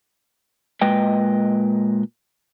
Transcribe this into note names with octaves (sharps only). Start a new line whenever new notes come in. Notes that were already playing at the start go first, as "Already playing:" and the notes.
A#2 G#3 B4 D#5 G5